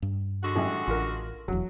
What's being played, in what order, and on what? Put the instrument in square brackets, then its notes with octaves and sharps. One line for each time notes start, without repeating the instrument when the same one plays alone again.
[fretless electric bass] G2
[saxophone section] D3 G#3 F#4
[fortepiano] A1 G3 E5
[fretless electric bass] A1 [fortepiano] F4 A#4
[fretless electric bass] E1 E2 [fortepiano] F#3